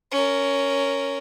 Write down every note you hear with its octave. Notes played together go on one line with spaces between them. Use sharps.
C#4 A#4